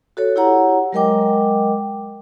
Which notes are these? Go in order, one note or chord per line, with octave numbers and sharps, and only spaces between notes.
F#4 A4 C#5
E4 G4 C#5 F#5 A#5
F#3 G#3 A#4 D#5 G5 D6